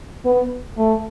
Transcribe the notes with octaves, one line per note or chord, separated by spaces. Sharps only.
B3
A3